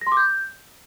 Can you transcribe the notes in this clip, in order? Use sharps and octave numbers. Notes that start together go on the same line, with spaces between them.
A#6
C6
D6
G6